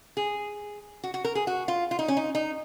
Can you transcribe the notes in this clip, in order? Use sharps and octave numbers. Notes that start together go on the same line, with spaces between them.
G#4
F#4
F#4
A#4
G#4
F#4
F4
F4
D#4
C#4
D#4
D#4